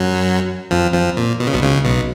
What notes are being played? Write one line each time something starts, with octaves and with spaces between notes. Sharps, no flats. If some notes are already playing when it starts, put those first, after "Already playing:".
Already playing: F#2 F#3
F2 F3
F2 F3
A#2
B2
C#3
B1 B2
C#2 C#3
B1 B2